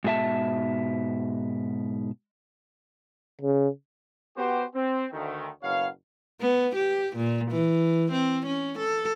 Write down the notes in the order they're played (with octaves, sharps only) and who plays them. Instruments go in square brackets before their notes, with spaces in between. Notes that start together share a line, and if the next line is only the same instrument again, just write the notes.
[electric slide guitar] G#2 B2 G#4 E5 A5
[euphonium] C#3
[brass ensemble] B3 F#4 G4 C5
C4
D2 D#3 A3
F#1 B2 F#4 C#5 F5
[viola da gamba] B3
G4
A#2
E3
C4
C#4
A4